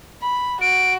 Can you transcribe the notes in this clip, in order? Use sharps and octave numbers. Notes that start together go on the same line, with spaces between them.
B5
F#4 D7